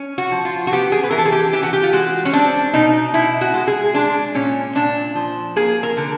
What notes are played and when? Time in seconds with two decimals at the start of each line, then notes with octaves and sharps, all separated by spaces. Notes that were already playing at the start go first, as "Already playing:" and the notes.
Already playing: C#4
0.18 F#4
0.32 F3
0.45 F4
0.67 F#4
0.72 B3 G4
0.92 G#4
1.04 B4
1.11 E3 A#4
1.18 A4
1.25 G#4
1.32 G4
1.53 E3 G4
1.63 F#4
1.73 G4
1.83 F4
1.93 G#3 F#4
2.25 C#4
2.33 C4 D4
2.74 B2 D#4
3.14 B2 E4
3.41 F#4
3.54 G#3
3.67 G#4
3.94 G#3 D4
4.35 A#2 C#4
4.75 A#2 D4
5.15 F3
5.56 A#3 G#4
5.83 A#4
5.97 D3